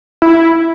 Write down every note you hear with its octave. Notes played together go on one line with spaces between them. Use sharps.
E4